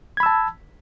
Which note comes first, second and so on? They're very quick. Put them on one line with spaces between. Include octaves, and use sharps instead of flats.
G#6 B5 E6 A5